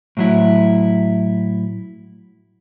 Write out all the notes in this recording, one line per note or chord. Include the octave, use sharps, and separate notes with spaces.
A2 F#3 E4